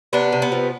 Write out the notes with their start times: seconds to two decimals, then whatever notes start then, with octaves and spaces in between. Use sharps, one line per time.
0.13 C3 B3 D4
0.32 C3
0.42 B3
0.52 F3